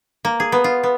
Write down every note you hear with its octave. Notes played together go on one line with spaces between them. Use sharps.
A#3
G#4
B3
F4
B3